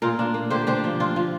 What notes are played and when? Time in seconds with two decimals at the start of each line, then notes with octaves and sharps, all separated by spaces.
0.02 A#2 F4 A#4
0.19 D4
0.34 A#3
0.50 D3 G4 C5
0.67 D4 G4 C5
0.84 F3
1.00 D4 F4
1.16 F3